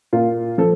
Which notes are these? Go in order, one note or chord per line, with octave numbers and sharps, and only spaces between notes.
A#2 F4
F3 A4